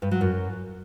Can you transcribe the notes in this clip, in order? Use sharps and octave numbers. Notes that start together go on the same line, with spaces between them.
G2
F#3
F#2